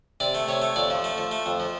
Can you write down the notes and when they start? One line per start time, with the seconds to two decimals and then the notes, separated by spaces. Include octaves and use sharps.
0.20 C3 D5
0.34 A3
0.48 C3 C#5
0.62 A3
0.76 F2 D5
0.90 F3
1.04 A3
1.18 F3
1.31 A3
1.46 F2
1.60 F3